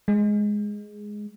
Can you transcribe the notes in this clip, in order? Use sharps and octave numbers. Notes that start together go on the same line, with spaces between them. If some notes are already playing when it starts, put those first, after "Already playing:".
G#3